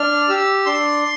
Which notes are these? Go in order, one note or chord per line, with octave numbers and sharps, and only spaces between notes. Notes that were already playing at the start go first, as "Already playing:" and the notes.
Already playing: D4 F6
G4 E6
D4 C6